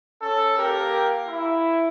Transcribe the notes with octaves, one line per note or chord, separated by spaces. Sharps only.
C#4 A4
A#3 G4 A#4
E4